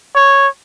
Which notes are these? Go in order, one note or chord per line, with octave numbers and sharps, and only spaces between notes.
C#5